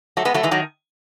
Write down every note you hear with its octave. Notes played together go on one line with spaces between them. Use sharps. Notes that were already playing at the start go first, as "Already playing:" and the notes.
F#3 A3
G#3 B3
F#3 A3
E3 G#3
D#3 F#3